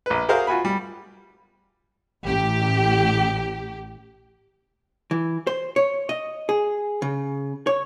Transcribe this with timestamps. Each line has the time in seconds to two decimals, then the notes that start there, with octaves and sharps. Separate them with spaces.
0.06 A#1 B4
0.29 F#4 G#4 A#4 C5 E5 F5
0.47 F4 F#4 G#5 B5
0.65 G3
2.23 A1 G4
5.11 E3
5.47 C5
5.76 C#5
6.09 D#5
6.49 G#4
7.02 C#3
7.67 C#5